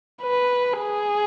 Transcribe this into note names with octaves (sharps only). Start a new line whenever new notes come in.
B4
G#4